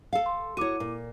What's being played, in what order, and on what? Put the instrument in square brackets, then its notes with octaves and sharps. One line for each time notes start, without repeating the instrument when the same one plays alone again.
[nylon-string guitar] A4 F5
[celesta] C6
[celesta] E4 D6 D#7 [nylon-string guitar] F#4 C#5
[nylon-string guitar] A#2